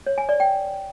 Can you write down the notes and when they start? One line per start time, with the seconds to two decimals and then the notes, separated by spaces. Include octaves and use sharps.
0.07 C#5
0.18 G#5
0.29 D5
0.40 G5